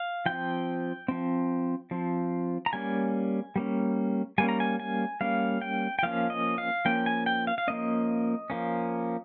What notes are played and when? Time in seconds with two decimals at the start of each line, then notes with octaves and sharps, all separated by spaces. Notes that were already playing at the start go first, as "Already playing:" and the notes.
Already playing: F5
0.26 F3 C4 G5
1.08 F3 C4
1.91 F3 C4
2.66 A#5
2.73 G3 A#3 C#4 G#5
3.56 G3 A#3 C#4
4.38 G3 A#3 C#4 G#5
4.49 A#5
4.60 G#5
4.80 G#5
5.21 G3 A#3 C#4 F5
5.62 G5
5.99 G5
6.03 F3 A#3 C#4 F5
6.30 D#5
6.58 F5
6.85 F3 A#3 C#4 G5
7.06 G#5
7.26 G5
7.47 F5
7.58 F5
7.67 F3 A#3 C#4 D#5
8.50 F3 A#3 C#4